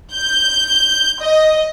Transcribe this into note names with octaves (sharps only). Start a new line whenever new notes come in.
G6
D#5